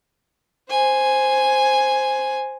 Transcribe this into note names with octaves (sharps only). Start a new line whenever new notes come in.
C5 G#5